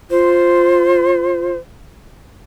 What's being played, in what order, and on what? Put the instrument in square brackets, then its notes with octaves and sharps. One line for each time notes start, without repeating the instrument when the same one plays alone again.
[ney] F4 [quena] C5